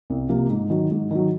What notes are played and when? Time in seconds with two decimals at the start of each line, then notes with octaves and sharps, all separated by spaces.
0.10 C2
0.29 C3 F3 A#3
0.50 G#2
0.70 D#3 F#3
0.91 G#2
1.11 D#3 F#3